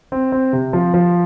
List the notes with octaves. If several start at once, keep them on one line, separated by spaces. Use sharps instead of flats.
C4
C4
C3
F3
F3